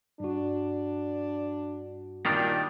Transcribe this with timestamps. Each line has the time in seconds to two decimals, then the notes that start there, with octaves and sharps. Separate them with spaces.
0.20 G2 D4 F#4
2.26 A#2 D#3 G3 D4